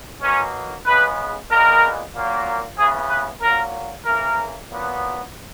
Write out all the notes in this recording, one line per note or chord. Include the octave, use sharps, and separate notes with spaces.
B2 F#3 A#3 C#4
C#3 G#3 B3 B4
A#2 G#3 B3 A#4
A#2 F#3 A#3
C#3 E3 B3 G#4
B4
A#2 F#3 A#3 A#4
C#3 E3 A#3 A#4
A#2 F#3 B3